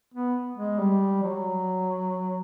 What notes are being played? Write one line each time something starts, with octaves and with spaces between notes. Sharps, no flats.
B3
G#3
G3
F#3